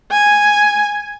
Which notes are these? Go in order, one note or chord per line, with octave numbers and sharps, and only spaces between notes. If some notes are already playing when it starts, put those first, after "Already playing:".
G#5